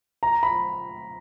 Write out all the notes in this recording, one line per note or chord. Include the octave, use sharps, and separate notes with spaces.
A#5
B5